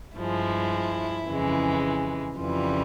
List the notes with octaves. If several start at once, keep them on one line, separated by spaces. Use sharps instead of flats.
G2 F3 G#3 E4
F2 C#3 E3 G#3
F2 C#3 E3 G3 F4